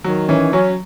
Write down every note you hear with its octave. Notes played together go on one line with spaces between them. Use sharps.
D#3 F#3
E3 C#4
F#3 C#4